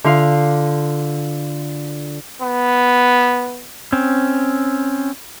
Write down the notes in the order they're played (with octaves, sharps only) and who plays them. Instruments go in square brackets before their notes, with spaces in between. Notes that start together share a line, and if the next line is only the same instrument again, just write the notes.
[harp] D3 F4 F5
[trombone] B3
[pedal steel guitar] C4 C#4